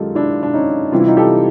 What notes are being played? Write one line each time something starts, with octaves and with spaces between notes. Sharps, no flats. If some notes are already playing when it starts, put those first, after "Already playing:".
Already playing: F#2 D#3 G#3 D#4 F4 G4 A4
D4 E4
D4
C#4 D#4
C3 E3 G3 F4
E4
D#4 F4
G4 A4